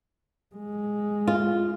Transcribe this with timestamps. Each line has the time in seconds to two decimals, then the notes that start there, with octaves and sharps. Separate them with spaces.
0.55 G#3
1.27 F4